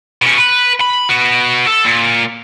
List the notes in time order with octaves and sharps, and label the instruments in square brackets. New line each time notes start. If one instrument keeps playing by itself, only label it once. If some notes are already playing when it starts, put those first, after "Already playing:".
[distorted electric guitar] B2 C#4
B4
B5
B3 F#4
A4
A#2